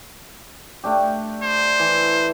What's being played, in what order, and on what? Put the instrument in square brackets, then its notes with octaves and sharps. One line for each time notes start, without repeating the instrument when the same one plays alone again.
[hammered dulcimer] A3 D4 G4
[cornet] C5
[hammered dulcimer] E3